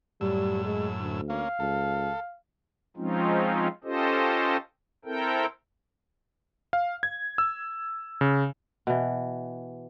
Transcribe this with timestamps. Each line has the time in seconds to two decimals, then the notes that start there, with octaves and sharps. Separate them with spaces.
0.21 F#2 A2 G3 E6
0.65 G#3
1.00 D2
1.30 A#3 C#4 F5
1.60 C#2 A4
2.97 F3 G#3 C4 C#4 D#4 F4
3.84 C#4 F4 G4 A4 C5 D#5
5.05 C4 E4 A4 A#4 G5
6.73 F5
7.03 G#6
7.38 E6
8.21 C#3
8.87 B2 E3